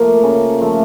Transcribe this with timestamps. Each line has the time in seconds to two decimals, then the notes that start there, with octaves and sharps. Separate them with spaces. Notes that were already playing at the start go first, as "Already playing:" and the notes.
Already playing: F3 A3 A#3 A#4
0.23 C#3
0.61 F3 A3